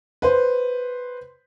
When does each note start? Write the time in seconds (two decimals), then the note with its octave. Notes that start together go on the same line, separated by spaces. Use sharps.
0.22 B4 C5